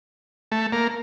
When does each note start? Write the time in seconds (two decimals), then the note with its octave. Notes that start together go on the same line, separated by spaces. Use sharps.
0.52 A3
0.73 A#3